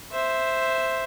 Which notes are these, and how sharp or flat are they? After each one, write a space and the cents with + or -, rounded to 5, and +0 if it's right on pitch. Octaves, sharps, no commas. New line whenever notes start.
C5 +0 E5 +0